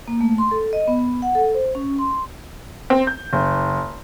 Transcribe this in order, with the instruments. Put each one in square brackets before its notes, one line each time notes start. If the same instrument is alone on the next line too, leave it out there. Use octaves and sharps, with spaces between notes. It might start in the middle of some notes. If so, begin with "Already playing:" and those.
[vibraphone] A#3
A3
C6
A4
D#5
B3
F#5
A4
C5
C#4
C6
[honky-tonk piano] C4
G6
F#1